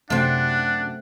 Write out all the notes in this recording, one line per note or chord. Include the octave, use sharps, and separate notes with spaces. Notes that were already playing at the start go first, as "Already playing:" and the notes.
F#2 C3 A3 C4 D4 F#5